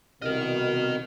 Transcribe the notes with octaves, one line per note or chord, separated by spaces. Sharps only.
C2 B2 A#4 D#5 F6